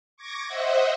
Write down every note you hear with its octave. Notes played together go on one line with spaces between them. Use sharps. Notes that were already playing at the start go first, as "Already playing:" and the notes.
C#6 D6 G#6 A#6
C5 D#5 E5 F#5